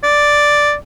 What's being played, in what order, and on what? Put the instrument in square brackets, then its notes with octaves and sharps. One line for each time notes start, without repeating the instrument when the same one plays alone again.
[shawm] D5